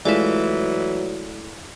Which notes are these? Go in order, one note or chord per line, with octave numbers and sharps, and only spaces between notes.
E3 F#3 G#3 A3 E4 F4 D5